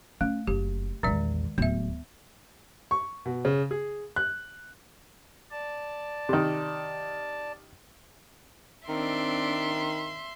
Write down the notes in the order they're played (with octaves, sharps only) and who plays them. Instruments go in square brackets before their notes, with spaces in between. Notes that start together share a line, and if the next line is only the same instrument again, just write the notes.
[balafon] A3 [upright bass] C#4
[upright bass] F#1 [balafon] G4
[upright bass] A#1 E2 [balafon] D#3 G#3 D5
[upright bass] D1 [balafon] B3 E5
[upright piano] C#6
B2
C#3
G#4
F#6
[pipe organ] D5 A5
[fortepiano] C3 D#3
[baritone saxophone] D#3 [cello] C4 D4 [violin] E5 C6